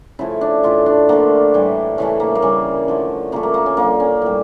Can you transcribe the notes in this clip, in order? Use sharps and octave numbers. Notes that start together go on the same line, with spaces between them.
C#3 F3 A3 E4
D4
A2 E3 A3 F4
D4
D3 F3 A3 A#3
A2 E3 G3
C#3 E3 A3 C#4
A#3
A#3
C#3 E3 G3 C#4
D3 F3 A3
C#3 F3 A3 A#3
A#3
A#3
C#4
D3 G3 A#3
C#4
A2 G3